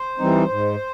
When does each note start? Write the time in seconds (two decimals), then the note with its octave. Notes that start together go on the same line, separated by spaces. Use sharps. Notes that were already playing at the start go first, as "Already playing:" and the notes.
Already playing: C5
0.18 E3 G3 C4 D#4
0.50 G#2